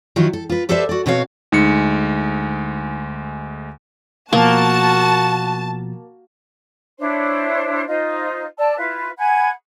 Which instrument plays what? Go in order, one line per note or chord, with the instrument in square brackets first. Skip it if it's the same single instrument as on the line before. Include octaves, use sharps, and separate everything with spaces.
[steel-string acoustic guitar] D#3 E3 F#3 E4 F4
A4
F4 B4
G4 A4 B4 C5 D5 E5
F#4 D5
B2 C4 F#4 C#5 F5
[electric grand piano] D2 G#3 C#7 [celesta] D#4
[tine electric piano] B2 F3 [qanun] A#3 [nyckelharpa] F#4 [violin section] A5
[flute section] D4 E4 C5 C#5
D#4 F4 C5 D#5
D5 A5 E6
E4 F4 B4 F5
F#5 G#5 B5 G#6